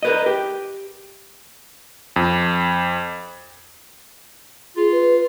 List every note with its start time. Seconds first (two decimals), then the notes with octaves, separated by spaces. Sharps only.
0.03 A#4 B4 D#5
0.26 G4
2.16 F2
4.77 F4 G#4
4.92 B4